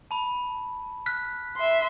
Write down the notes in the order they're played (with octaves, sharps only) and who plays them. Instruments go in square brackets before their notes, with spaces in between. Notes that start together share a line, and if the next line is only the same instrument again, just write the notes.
[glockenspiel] A5 B5
F6 F#6 B6
[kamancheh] E5 C6